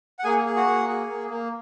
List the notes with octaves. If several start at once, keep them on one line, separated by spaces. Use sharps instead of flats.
F#5
A#3 G#4 G#5
G#4
F#4 F#5
A#3
G#4
A#3
A#3